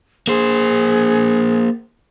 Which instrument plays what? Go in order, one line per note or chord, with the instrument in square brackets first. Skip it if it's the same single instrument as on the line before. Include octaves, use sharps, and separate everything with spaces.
[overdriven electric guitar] A#3 C5 [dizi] G#4